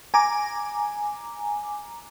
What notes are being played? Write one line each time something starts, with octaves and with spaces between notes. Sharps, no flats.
G#5 A#5 D6